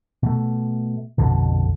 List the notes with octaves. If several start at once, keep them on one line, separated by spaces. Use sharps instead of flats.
B2 A3
A#1 F2 B2 D3